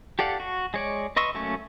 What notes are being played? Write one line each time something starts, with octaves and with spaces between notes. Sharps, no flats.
G4 A4 D5 F5 F#5
F#4
G#3 C#5 D5
B4 D#5 C6 C#6 E6
F#3 A3 A#3 C#4 C#6